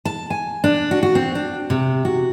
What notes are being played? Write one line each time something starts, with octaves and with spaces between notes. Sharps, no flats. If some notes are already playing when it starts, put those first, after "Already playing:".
A5
G#5
D4
F#4
F#4
C4
D4
C3
F#4